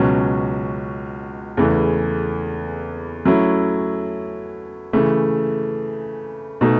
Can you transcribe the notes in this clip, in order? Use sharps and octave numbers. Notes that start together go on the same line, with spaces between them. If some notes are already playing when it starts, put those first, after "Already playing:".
Already playing: C#2 B2 F#3 C#4
E2 C#3 E3 A3
F#3 A3 C#4 E4
C#3 E3 A3
B2 A3 D#4